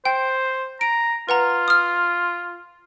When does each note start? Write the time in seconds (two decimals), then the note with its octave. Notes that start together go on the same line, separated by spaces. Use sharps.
0.05 C5 G5
0.81 A#5 D7
1.29 F4 B4 F#5 A#5
1.68 D#6 F6